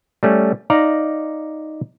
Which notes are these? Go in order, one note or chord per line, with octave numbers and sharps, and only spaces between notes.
G3 A3 C#4
D#4 D5 F5 A#5